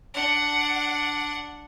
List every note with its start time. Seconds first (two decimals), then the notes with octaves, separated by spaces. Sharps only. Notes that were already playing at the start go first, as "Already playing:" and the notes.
0.14 D4 F#5